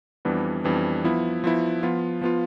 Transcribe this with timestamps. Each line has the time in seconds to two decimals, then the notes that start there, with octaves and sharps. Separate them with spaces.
0.25 F2 E3 G3 B3 D4
0.64 F2 E3 G3 B3 D4
1.04 F3 B3 E4
1.44 F3 B3 E4
1.83 F3 B3 F4
2.21 F3 B3 F4